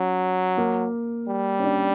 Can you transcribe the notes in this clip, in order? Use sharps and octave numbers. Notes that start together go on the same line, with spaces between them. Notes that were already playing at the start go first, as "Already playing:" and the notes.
Already playing: F#3 C#4
A#3
G3
C#4
D4